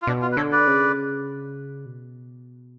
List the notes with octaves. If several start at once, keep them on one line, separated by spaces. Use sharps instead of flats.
F4
B2 D4
F4
B4
D3 A4 C#5
B4 D5
C#3
B2